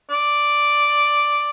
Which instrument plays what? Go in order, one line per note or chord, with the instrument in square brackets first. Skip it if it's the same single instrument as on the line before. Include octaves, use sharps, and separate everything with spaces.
[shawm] D5